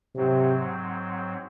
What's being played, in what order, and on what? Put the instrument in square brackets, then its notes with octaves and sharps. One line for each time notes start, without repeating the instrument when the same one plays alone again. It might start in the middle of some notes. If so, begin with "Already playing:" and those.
[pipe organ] G#2 F#3 C4 [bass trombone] C3